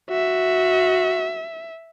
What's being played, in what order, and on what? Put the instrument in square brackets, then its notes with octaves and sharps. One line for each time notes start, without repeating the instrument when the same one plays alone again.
[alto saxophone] F#4 [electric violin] E5